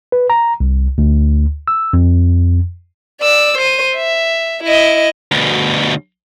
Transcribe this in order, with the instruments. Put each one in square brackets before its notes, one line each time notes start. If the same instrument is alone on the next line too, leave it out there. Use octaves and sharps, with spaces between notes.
[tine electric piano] B4
A#5
C2
D2
E6
F2
[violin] D5 E6
C5 D#7
E5
E4 D#5
[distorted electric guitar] D2 B2